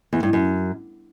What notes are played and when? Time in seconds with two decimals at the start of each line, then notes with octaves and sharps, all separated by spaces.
0.13 E2
0.23 G2
0.33 F#2